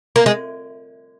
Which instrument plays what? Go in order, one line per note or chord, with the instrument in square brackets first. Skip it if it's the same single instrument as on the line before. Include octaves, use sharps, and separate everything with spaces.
[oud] A#3
G#3